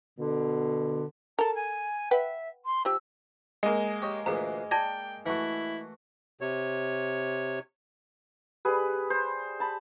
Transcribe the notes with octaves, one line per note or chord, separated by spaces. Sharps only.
B2 D3
A4 A#4 A5
G#5
B4 E5 F#5 G5
C6
F3 G4 E6
G#3 A#3
G4 C#5 D#5
D2 A#2 E3 G#4 A#5
D5 G5 A5 G#6 A#6
E3 A3 E4 F#4
C3 C#5
G3 G#4 B4
C5
A5 B5